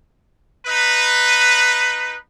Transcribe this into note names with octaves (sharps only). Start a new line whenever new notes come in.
D#4 B4